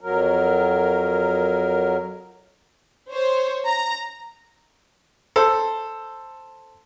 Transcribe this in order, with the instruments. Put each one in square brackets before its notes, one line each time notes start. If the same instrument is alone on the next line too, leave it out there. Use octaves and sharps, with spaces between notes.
[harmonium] F2 F#3 A#4
[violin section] C5 C#5
A#5
[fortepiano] A4 C5